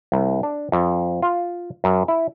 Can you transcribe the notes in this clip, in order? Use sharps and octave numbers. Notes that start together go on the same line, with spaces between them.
C2
D4
F2
F4
F#2
E4